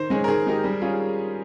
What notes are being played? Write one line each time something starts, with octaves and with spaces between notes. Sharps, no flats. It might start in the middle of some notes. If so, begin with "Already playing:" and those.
Already playing: D#3 C5
G#3 C#4 G#4
A#4
D#3 G#4
G#3 D#4 G4 A#4
G3
C#4 F4 G#4